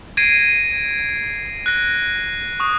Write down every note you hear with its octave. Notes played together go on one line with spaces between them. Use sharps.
G#6 A#6 C7 D7 D#7
F#6 A#6
C#6 D#6